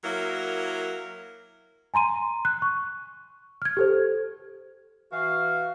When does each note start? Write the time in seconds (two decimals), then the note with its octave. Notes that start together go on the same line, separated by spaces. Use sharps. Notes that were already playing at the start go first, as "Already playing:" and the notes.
0.03 F#3 A#3 E4 A#4
1.94 G#5 A#5 C6 D#7
2.45 F#6
2.62 C#6
3.62 F6 G#6
3.77 G4 A4 C5
5.12 E3 F#4 F5